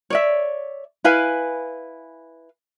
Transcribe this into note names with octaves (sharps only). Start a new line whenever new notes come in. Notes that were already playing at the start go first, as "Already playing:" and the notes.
C#5 D5 E5
E4 B4 F5 G#5